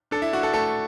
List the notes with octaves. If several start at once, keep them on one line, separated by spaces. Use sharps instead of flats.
D4 A4
E4
D4 F#4
A4
A3 A4